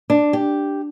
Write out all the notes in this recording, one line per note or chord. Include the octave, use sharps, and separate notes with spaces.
D4
G4